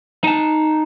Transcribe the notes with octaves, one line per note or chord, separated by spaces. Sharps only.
D#4 A5